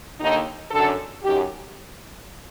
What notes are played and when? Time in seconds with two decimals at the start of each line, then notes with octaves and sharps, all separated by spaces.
0.20 D#2 D3 D#4
0.71 F#2 D3 A4
1.23 F#2 D#3 G4